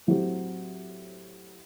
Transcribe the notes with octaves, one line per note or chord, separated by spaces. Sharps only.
A2 F#3 C4 G4